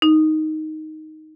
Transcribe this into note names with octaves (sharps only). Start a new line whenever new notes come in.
D#4